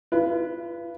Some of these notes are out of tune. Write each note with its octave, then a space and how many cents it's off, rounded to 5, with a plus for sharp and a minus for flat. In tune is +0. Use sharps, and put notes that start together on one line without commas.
F4 -40 B4 +0